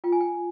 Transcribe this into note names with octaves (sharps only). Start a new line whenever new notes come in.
F4 G5
G#5
G5